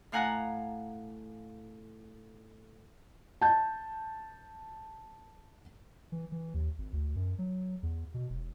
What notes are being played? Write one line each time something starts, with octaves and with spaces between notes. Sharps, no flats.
A2 F5 F#5 G#5 A#5 F#6
A5 G6
E3
E3
D#2
G#1
D2
F#2
F#3
E2
B2
E1